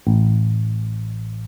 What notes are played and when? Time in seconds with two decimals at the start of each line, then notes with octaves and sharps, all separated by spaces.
0.07 A1